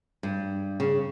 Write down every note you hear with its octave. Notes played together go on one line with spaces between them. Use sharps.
G2
C#3